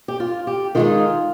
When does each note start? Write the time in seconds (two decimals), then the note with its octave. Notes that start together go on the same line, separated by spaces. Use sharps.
0.08 G4
0.20 F4
0.47 G4
0.75 D#3 G#3 D#4 F4